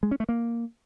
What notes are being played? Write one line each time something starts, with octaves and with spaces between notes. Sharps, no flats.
G#3
C#4
A3
A#3